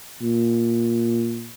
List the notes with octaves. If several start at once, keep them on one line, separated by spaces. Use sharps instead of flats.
A#2